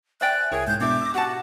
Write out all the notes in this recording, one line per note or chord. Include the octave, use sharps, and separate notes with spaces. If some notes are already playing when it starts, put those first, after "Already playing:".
C5 D5 E5 G5 G#5 F#6
C2 E4 G#4 A#4 C#5
G#2 G6
B2 D4 E4 E5 D6
E6 A#6
F#4 G4 F#5 A5 F#6